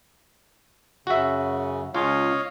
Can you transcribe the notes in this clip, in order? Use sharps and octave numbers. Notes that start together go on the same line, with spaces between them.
F#2 C#3 F#4 E5
C#2 F4 C#5 D#5 F5